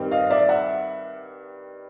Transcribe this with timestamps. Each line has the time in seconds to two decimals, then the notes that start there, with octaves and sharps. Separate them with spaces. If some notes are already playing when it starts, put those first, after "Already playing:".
Already playing: G2 D#3 G3 C4
0.12 D#5 F5
0.30 D5 E5
0.49 E5 F#5